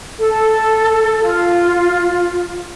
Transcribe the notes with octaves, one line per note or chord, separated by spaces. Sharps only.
A4
F4